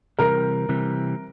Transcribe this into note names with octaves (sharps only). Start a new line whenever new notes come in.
C3 E3 G3 C4 A#4
C3 E3 G3 C4